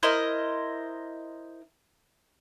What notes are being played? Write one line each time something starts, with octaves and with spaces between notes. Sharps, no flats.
E4 A#4 C5 D#5